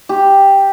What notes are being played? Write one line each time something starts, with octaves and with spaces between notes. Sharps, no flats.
G4